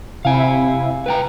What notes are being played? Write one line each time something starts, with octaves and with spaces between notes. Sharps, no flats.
C3 E4 F5 G#5
B4 G5 A#5